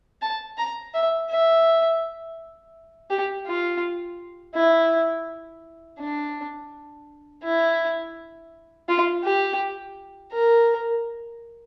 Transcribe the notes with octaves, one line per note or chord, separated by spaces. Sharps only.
A5
A#5
E5
E5
G4
F4
E4
D4
E4
F4
G4
A#4